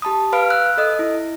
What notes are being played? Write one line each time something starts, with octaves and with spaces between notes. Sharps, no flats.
G4 A5 B5 D#6
B4 F5 B5 F6 D7
E6 F#6
A4 D#5 D#6
E4